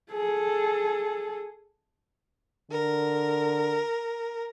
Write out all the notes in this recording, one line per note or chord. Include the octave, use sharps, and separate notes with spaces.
G#4 A4
D3 A#4